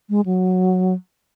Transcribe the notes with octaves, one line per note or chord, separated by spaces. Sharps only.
G#3
F#3